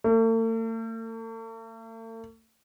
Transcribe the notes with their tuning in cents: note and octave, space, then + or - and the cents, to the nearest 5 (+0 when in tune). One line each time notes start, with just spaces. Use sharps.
A3 +45